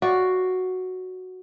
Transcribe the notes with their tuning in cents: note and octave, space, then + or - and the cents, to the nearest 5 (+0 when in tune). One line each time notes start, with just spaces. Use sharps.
F#4 +0 D5 +0 F5 +5